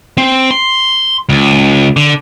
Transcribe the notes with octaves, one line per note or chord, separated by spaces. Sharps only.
C4
C6
C#2
D3